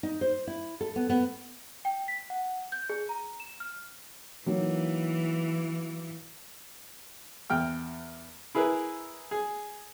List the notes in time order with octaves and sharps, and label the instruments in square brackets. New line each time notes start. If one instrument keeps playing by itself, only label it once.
[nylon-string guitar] D#4
C5
E4
A4
B3
B3
[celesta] G5
B6
F#5
G6
G#4
A#5
E7
F6
[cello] E3 [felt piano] F#3 A#3 D#4
[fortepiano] E2 G5 F6
E4 G#4 A#4 B4
G#4